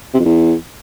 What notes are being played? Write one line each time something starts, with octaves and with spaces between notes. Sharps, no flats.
C3
F2
E2